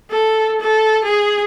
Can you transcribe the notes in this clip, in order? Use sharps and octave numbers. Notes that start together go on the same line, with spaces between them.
A4
A4
G#4